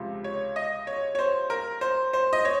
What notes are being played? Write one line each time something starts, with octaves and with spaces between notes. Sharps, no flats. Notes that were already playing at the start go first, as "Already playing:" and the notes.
Already playing: C#2 C3 F3
C#5
D#5
C#5
C#5
C5
A#4
C5
C5
D#5
C#5